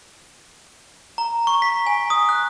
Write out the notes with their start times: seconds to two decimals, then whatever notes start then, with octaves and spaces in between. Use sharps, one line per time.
1.18 A#5
1.47 C#6
1.62 B6
1.87 G#5
2.10 D#6
2.29 F#6